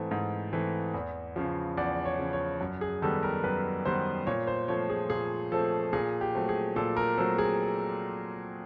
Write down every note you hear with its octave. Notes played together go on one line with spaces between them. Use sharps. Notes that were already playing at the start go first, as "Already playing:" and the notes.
Already playing: G#2 E3 A3 C4
G#2
E3 A3 C4
E2
C#3 F3
E2 D5
C#5
C#3 F3
C#5
F#2
G#4
D#3 G3 B3 A4
A#4
F#2 B4
D#3 G3 B3 C5
A#2 C#5
C5
F3 A3 C4 C#5
G#4
A#2 G#4
F3 A3 C4 A4
A#2 G#4
G4
F#3 A3 C4
G#4
A#2 A4
A#4
F#3 A3 C4 A4
G#4